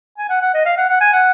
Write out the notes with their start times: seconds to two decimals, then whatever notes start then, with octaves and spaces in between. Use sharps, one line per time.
0.18 G#5
0.29 F#5
0.42 F#5
0.54 D#5
0.65 F5
0.77 F#5
0.89 F#5
1.01 G#5
1.13 F#5